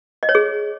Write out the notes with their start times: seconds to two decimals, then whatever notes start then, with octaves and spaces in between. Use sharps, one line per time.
0.23 D#5
0.29 C#5
0.35 G#4